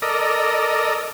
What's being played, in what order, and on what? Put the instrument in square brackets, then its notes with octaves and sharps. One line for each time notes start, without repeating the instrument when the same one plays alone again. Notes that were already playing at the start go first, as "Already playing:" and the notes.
[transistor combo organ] A4 A#4 D5 D#5